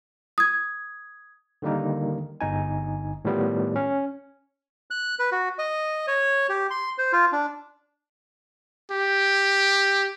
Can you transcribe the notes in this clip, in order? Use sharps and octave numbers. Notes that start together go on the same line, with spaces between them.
D#6 G#6
D3 D#3 G3 A#3 D#4
G1 D#4 G#5
A2 D#3 G3 B3 F4
C#4
F#6
B4
F#4
D#5
C#5
G4
C6
C5
F4
D4
G4